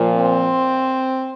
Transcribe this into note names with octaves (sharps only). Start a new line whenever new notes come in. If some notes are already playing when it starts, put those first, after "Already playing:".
Already playing: A#2 F3
C4